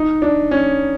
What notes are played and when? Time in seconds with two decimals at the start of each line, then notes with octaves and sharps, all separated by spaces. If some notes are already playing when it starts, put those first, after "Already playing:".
Already playing: D#4
0.22 D4
0.51 C#4